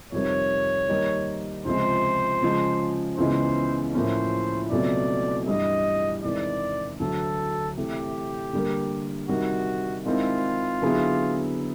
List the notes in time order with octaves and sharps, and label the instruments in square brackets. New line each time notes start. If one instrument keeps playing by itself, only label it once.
[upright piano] F2 C3 D#3 G3 [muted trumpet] C#5
[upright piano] D#2 D#3 G3 A#3 D#4
[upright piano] C#2 C3 F3 G#3 [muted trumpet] C5
[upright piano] C#3 F3 G#3
[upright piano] C#2 C#3 E3 G#3 B3 [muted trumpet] C5
[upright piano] A2 F3 A#3 C#4 [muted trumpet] C5
[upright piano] C#2 B2 F#3 A3 C4 [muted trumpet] D5
[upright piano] G2 E3 G3 [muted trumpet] D#5
[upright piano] E2 C3 D#3 G#3 [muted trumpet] D5
[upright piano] D2 D3 F#3 [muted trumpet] A4
[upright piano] C3 E3 A3 [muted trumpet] G4
[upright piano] D3 G3 A#3
[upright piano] C3 D#3 G3 [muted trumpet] F#4
[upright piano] D#3 G#3 C4 E4 [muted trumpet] F4
[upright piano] D3 F#3 B3 E4 G#4